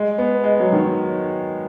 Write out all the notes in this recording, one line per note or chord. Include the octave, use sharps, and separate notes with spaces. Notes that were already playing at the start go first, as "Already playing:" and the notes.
Already playing: G#3
B3
G#3
F#3
D#3
F#3